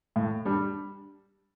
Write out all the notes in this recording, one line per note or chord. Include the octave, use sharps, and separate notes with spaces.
A2
G3 D4